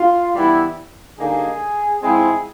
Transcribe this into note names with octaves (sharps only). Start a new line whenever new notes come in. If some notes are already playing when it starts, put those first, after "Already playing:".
Already playing: F4
G2 E3 G3 B3 E4
D3 G3 A#3 D#4 G#4
G#2 F3 G#3 C4 E4 G#4